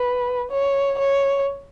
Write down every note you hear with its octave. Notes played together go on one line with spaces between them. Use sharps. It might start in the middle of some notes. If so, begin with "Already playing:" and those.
Already playing: B4
C#5
C#5